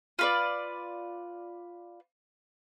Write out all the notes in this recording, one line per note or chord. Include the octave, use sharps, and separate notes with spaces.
F4 B4 D5